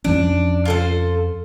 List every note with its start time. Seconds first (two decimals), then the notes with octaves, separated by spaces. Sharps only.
0.04 F2 F3 C#4 D4
0.65 F4 A4 C5